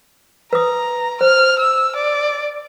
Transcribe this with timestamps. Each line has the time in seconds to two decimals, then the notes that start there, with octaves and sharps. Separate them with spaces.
0.53 B4 A#5 D#6
1.21 C5 F6
1.59 E6
1.96 D5